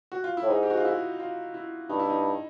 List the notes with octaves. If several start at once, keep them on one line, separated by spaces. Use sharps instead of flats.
F#4
F4
E4
A2
G#2 D#4
G4
F#4
F4
E4
F4
E4
G2 D#4
E4
D#4